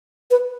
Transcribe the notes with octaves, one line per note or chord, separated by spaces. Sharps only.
B4